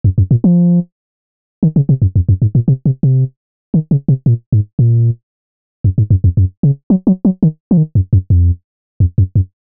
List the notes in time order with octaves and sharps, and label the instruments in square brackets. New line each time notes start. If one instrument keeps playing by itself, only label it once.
[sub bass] F#2
F#2
A#2
F3
D#3
C#3
C3
F#2
F2
F#2
G#2
A#2
C3
C3
C3
D#3
C#3
C3
A#2
G#2
A#2
F#2
G#2
F#2
F2
F#2
C#3
F#3
F#3
F#3
D#3
F3
D#3
F#2
F#2
F2
F2
F#2
F#2